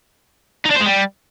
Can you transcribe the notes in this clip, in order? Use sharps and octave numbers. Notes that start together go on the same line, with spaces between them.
D#4
D4
C5
G#3
G3